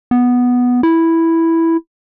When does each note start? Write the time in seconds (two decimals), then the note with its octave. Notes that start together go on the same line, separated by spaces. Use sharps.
0.11 B3
0.83 E4